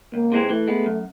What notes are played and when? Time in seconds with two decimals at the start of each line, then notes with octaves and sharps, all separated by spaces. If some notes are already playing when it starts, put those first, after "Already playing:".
0.14 C#2 A#3
0.32 C3 E3 G#3 C4
0.50 E3 A3
0.68 G#3 B3
0.86 F#2